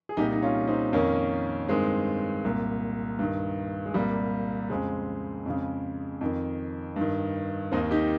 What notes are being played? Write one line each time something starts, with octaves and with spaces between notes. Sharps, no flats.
G#4
C2 A#2 D#4 G4
D#4
C#4 F4
C4 D#4
F2 D#3 A#3 C#4
G2 D#3 G#3 C4
C2 A#2
G2 D#3
G#3
C2 A#2 G3 A#3
F2 C#3 G#3 C4
F2 C#3
F2 D#3
G2
D#3
D#2 D#3 C4 D#4
D#4 G4